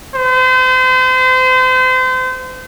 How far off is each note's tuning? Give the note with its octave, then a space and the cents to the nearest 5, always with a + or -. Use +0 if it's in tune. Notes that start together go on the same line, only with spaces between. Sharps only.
C5 -35